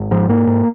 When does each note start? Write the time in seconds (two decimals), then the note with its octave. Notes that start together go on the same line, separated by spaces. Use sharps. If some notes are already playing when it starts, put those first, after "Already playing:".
Already playing: G#1
0.11 G#2 F3
0.29 G#2 A#3
0.47 G#2